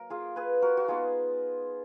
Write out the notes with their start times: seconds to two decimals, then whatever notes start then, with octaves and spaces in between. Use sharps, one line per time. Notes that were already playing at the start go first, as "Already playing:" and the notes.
Already playing: F#3 A#3 A#4
0.10 F4 G#4
0.36 G#4 B4
0.62 F#4 A#4
0.77 F#4
0.88 G#3 B3 D#4 F4 G#4